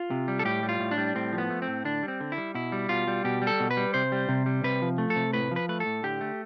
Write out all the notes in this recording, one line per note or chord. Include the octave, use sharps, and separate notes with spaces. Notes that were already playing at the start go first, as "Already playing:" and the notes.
Already playing: F4
C3
G3
A4
A2 G4
G3
F4
A2
D4
G3
A2 C4
F3
B3
A3
C4
A2
D3 D4
G3
C4
D3
E4
G3
B2 E4
G3
B2 F4
G3
B2 G4
G3
A4
B2
B4
G3
C3 C5
G3
C3
G3
C3 B4
F3
A3
A4
C3
A2 B4
F3 B4
A3 B4
A4
A2
D3 G4
A3